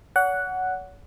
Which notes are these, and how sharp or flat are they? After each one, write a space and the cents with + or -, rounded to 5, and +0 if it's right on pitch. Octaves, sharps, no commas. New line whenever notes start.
C#5 +40 F#5 +0